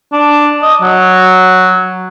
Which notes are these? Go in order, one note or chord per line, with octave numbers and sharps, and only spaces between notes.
D4
D#5
F#3